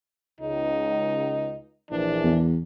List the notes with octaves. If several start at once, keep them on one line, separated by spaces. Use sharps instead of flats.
C#2 D#4
A#1 E3 D4
E2